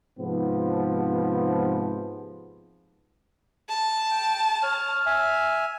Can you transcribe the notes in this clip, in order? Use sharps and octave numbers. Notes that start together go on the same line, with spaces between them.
G#2 C3 F3 B3
A5
G5
C#5 F6
E5 G#5